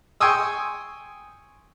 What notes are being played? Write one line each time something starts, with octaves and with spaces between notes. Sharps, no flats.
G5 G#5 C6 C#6 D#6 E6